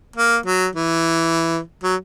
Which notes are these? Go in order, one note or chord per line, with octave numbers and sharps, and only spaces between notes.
A#3
F#3
E3
F#3